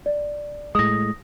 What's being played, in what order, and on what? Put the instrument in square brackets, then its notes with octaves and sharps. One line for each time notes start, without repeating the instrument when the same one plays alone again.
[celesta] D5
[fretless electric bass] A2 G#3 [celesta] D#6 A#6